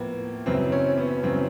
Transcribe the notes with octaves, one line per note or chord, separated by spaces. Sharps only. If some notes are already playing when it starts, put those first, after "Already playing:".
Already playing: A2 F3 A#3 B3
F#2 C#3 E3 C4
C#4
B3
F#2 C#3 E3 C4